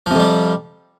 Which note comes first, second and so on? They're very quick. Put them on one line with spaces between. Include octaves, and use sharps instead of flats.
F3 C3 F2 G3